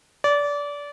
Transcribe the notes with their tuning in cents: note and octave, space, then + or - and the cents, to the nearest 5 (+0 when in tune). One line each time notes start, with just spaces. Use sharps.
D5 -25